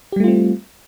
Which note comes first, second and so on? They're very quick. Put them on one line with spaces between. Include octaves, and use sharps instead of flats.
G4 G3 A3 F4 C4